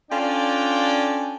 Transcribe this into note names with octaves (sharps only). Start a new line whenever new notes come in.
C#4 D4 F4 A4 D5 G5